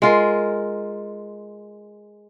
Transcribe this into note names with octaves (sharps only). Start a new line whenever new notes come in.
G#3 F4 A#4